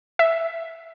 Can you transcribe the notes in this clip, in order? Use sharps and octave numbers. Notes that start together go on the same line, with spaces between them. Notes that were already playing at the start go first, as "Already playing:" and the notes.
E5